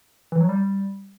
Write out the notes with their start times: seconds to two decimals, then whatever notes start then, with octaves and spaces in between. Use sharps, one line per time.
0.32 E3
0.41 F#3
0.49 G3